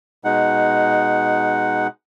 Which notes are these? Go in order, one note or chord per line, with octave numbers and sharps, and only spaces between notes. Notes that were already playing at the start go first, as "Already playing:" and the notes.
B2 G#3 D#4 F#5